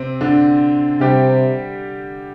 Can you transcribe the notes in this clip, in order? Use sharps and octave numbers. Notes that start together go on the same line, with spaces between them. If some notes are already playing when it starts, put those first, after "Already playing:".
Already playing: C3 C4
D3 D4
C3 G3 G4